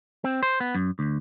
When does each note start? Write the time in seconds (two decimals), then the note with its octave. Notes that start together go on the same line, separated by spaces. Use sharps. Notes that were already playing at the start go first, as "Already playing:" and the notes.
0.24 C4
0.43 C5
0.60 B3
0.75 F#2
0.99 D2